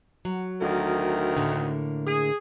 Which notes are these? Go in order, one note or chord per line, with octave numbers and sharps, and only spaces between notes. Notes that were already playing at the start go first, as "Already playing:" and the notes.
F#3
D2 D#3 A#4
A2 D3 A#3
G#4